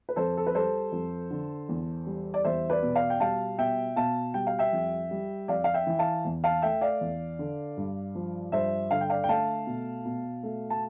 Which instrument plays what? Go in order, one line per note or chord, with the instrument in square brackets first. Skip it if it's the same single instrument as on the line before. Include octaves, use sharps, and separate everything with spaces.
[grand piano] B4
F2 A4 C5
A4
B4
G3 A4 C5
F2
D3
E2
G3
D5
E2 C5 E5
B4 D5
B2
D5 F5
G5
G3 F5 A5
B2 E5 G5
B2 F5 A5
G3 G5
F5
E5 G5
F2
G3
F2 D5 F5
F5
E5 G5
E3
F5 A5
E2
F5 A5
A3 E5 G5
D5 F5
E2
D3
G2
F3
G2 C5 E5
D3 F5
G5
D5 F5
G5
A3 F5 A5
B2
B2
A3
A5